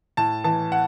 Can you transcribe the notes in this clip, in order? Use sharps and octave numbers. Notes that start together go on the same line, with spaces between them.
A2 A5
E3 A5
F#5